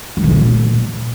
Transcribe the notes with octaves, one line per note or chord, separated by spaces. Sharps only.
G#3
C3
C#3
A#2